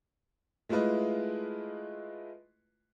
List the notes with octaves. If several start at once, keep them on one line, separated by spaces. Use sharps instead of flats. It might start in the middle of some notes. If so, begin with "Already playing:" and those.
G#3 A3 E4 F4 B4 D#5